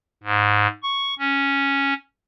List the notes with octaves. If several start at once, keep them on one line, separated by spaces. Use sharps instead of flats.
G#2
C#6
C#4